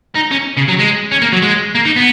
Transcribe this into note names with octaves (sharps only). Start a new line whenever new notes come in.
D#4
C#4
C#3
F#3
G#3
C#4
A#3
F#3
G#3
A#3
D#4
B3